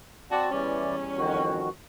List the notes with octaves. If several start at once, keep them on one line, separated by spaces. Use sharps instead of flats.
C4 F#4 D5 A5
E2 E3 G3 C#4 D5
F2 D#3 F#4